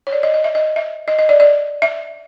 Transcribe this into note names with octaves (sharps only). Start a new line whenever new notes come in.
C#5
D5
D#5
D#5
E5
D#5
E5
D#5
D#5
D5
D5
E5